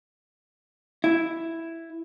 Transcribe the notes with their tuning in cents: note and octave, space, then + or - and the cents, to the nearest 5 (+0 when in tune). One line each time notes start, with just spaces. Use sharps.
E4 +0